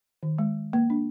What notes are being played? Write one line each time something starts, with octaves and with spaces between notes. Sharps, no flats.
D#3
G#3
A#3
D4